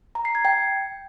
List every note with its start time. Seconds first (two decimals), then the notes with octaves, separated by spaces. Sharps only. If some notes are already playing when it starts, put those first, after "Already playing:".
0.15 A#5
0.25 C7
0.35 G#6
0.45 G5